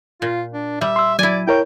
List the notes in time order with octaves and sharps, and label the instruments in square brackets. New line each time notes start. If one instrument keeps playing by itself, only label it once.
[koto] A#2 [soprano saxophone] F4
[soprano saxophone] D4
[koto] G3 [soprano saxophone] E5
[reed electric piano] C6 E6
[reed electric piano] F#3 [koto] E4 G#5 [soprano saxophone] D5
[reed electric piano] E4 A#4 C#5 [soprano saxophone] G5